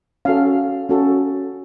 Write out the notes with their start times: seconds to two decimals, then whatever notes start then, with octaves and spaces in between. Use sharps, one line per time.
0.25 C#4 F#4 A4 F5
0.89 C#4 F#4 A4